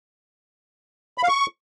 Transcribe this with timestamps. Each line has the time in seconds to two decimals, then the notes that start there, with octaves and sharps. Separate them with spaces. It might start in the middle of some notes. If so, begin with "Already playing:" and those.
1.18 B5
1.23 F5
1.28 C#6